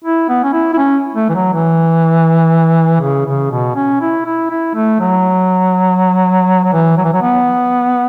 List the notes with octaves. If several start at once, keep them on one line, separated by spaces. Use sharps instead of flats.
E4
B3
C#4
E4
E4
C#4
A3
E3
F#3
E3
C#3
C#3
B2
C#4
E4
E4
E4
A3
F#3
F#3
E3
F#3
E3
F#3
B3